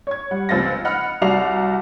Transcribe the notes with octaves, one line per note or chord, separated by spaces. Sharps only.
C#5 G#6
G3 F#5
F1 C#2 C4 F5 A6 A#6
D#5 F#5 B5 F6
C2 F#4 D5 A#5 C7 F7